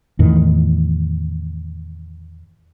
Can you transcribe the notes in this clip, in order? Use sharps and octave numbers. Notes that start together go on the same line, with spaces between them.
E2 A2 D#3